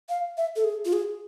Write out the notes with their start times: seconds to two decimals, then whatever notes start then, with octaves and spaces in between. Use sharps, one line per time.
0.09 F5
0.38 E5
0.56 A4
0.64 G#4
0.85 F4
0.93 G#4